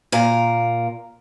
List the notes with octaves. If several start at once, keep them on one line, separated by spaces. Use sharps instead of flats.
A#2 F4 A#4